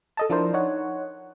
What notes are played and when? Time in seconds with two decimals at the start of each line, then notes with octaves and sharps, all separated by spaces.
0.17 A4 D#5 A5
0.30 F3 D4 E4 A#4 C5
0.54 D#4 C#5 F#5